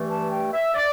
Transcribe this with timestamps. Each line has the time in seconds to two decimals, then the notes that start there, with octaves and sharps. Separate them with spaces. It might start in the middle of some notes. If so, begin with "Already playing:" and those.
Already playing: G2 E3 A3
0.09 A5
0.31 G5
0.53 E5
0.74 D5